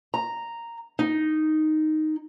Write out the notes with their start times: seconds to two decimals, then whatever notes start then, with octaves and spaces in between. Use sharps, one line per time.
0.14 A#5
0.99 D#4